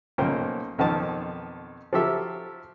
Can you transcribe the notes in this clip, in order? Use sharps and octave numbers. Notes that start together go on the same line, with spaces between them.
B1 A#2 A#3 C#4 C5 G5
B1 F2 D#3 C4 A5
F3 F#3 G4 A4 E5